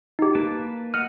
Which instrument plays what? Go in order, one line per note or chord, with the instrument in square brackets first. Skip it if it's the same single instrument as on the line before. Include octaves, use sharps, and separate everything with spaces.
[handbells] D#4 G4
[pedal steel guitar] A#3 B4 A5
[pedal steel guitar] D#5 F#5 [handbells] F6